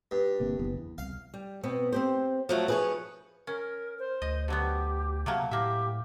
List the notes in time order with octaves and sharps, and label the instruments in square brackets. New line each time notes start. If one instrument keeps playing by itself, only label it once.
[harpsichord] G2
[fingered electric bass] G1 C3 A#3
F#1 E3 B3
E2
[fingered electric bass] C2 [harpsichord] F5
[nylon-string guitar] G3
B2 B3 C4
C4 G4 C5
[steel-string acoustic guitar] F3 F#3 A3
[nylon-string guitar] F3 G#4 [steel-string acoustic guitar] B4 C#5
[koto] C#4 [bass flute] A#4
[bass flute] C5
[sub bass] D2 [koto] D#5
[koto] D3 F#3 B3 [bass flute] G4
[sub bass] C3 [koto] F#3 A3 A#3
[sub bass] A2 [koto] A#3 E5 [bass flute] G4